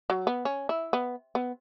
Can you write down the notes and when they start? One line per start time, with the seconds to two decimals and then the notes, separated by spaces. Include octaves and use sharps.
0.10 F#3
0.27 B3
0.45 C#4
0.69 E4
0.93 B3
1.35 B3